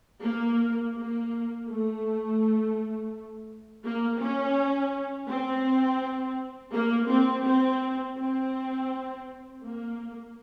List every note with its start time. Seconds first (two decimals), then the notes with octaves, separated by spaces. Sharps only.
0.23 A#3
0.95 A#3
1.68 A3
3.84 A#3
4.21 C#4
5.29 C4
6.73 A#3
7.10 C4
7.46 C4
8.18 C4
9.63 A#3